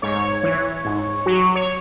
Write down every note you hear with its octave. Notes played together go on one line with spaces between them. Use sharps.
G#2 C#5
E3
G#2
F#3
C#5